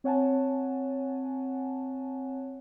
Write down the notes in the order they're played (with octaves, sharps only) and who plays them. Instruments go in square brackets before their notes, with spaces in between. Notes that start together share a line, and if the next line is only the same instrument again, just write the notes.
[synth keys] C4 C#5 F#5 G#5 A5